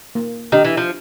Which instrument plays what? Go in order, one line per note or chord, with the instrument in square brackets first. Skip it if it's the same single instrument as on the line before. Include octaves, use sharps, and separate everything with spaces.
[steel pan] A#3
[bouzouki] D#3 [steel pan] D4 G4
[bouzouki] E3
F3